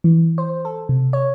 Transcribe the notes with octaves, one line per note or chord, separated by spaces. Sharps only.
E3
C5
A4
C3
C#5